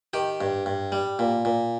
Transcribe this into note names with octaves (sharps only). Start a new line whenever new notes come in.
D#3 G4
G2
G2
G3
A#2
A#2